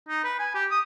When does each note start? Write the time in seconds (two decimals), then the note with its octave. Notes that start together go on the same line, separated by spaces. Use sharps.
0.09 D#4
0.24 B4
0.39 G#5
0.54 G4
0.71 D#6